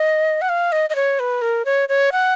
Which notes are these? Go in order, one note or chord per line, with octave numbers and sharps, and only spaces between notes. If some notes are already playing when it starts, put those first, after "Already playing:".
Already playing: D#5
F#5
F5
D#5
D#5
C#5
B4
A#4
C#5
C#5
F#5